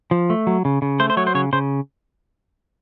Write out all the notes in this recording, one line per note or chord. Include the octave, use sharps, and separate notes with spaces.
F3
A3
F#3
C#3
C#3
A3 C5
C5
F#3 C#5
C5
C#3 C#5
C#3 C5